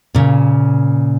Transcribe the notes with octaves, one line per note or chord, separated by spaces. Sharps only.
A#2 C#3